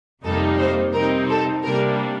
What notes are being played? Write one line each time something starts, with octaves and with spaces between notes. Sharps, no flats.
F2 C3 G3 A#3 D#4 A4
C5
C3 G3 C4 D#4 A#4
A4
C3 G3 A#3 D4 A#4